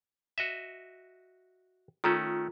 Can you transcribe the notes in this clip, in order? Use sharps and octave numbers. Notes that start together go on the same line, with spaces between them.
F#4 D#5 E5
D#3 A3 C#4 F4 A4 A#5